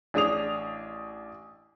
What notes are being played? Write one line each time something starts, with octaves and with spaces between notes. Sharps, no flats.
A1 D4 G#4 D#6 F7